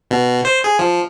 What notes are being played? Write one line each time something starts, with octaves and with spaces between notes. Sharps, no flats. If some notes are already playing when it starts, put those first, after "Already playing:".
B2
C5
G#4
F3